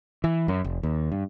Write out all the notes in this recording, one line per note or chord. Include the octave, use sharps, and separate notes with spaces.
E3
F#2
F1
D#2
G2